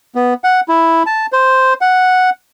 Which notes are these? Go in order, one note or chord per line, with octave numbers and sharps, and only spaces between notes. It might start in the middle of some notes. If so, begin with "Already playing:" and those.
B3
F#5
E4
A5
C5
F#5